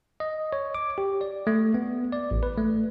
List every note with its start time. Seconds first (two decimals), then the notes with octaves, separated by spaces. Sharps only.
0.20 D#5
0.53 C#5
0.75 D6
0.98 G4
1.21 D5
1.47 A3
1.74 B3
2.12 D5
2.31 A1
2.43 B4
2.58 A3